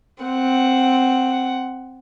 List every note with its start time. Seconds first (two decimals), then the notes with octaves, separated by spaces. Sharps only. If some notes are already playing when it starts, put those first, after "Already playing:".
0.23 C4 F#5